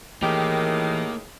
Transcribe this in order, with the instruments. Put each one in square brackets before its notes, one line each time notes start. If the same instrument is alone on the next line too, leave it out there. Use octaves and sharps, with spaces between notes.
[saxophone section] A2 D#3 G#4 [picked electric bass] E3 [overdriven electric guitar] A#3 [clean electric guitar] G4